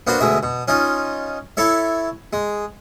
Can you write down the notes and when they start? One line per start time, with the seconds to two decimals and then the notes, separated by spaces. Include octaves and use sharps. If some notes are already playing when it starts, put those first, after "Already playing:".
0.07 A#3 B3 D4 F#4 C5
0.20 D2 B2 G#3 E5
0.43 B2
0.68 C#4 D#4 F4
1.57 E4 A4 C#5 E5
2.33 G#3